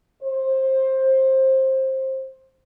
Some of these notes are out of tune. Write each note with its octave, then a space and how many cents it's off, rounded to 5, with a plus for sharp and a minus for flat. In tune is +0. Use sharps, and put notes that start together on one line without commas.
C5 +20